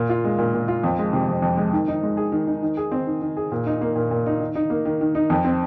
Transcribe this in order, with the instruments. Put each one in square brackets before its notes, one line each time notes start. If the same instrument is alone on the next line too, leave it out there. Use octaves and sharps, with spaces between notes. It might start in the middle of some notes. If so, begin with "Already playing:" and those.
Already playing: [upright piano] A#2
F4
G#3
A#2
A#2
F4
F2
G#3
C3
F2
F2
G#3
D#3
D#4
G#3
G#4
D#3
D#4
D#3
G#4
C4
D#3
D#3
G#4
A#2
D#4
A#3
A#2
A#2
D#4
D#3
D#4
A#3
D#3
D#3
D#4
F2
C4